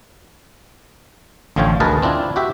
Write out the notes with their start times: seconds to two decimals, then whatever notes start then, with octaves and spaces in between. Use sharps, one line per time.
1.56 A1 D3 F3 F4 C#5 G5
1.80 D2 G#4 A#4 B4 D#5 A5
2.02 C4 D4 E4 F4
2.36 F#4 G4 E5